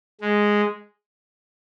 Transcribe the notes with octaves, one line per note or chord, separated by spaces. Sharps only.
G#3